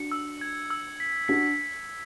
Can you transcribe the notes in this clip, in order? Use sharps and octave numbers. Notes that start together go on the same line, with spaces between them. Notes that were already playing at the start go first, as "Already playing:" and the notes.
Already playing: D4 F#4 C#7
E6
G#6
E6
B6
D4 F#4 B6